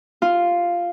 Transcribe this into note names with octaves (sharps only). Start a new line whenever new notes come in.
F4